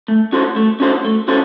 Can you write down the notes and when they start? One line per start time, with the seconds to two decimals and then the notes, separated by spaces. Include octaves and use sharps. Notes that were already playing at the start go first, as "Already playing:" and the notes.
0.08 A3
0.32 C#4 F#4 A4 C5
0.56 A3
0.80 C#4 F#4 A4 C5
1.05 A3
1.28 C#4 F#4 A4 C5